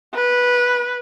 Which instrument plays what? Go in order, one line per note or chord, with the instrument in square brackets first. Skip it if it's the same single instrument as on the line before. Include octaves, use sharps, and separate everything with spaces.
[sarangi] B4